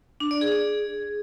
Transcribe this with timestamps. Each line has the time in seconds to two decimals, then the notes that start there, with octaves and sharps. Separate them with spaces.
0.20 D4
0.31 D5
0.41 G#4
0.52 G#4